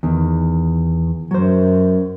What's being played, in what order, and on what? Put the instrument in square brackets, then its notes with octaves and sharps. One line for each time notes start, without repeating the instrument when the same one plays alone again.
[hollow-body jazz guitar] E2 D#3
[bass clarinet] F#2 [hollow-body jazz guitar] F#3 C5